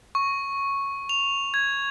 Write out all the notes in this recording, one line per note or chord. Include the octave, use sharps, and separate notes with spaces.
C#6
F7
G#6